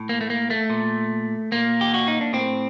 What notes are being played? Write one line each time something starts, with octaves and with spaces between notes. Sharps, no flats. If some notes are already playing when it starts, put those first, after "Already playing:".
Already playing: A2
A#3
A3
A#3
A3
A#2
A#2 A#3
G4
F#4
D#4
D4
A2 C4